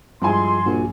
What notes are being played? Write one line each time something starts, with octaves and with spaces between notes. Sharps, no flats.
G2 F3 G#3 E4 G#5 C6
A#1 A#2 F#4